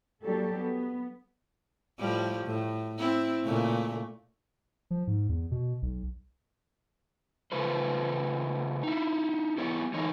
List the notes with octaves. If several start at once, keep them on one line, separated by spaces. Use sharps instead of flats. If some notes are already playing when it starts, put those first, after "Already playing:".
F#3 G3 A#3 D4 G4 A4
B3
A2 F3 G3
A2
C4 E4
A#2 C#3 A3
F3
G#2
E2
B2
B1
C#3 A3 F4 B4 C5
D#4 E4
B3 E4 G4 C#5
D3 E3 D#4 C#5